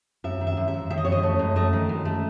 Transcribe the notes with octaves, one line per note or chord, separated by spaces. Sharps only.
F#2 E5
D#3
E5
F#2
E5
F#2
D#3 E5
D#5
F#2 C#5
D#5
A3
F#2
A3 D#5
D#3
F#2
A3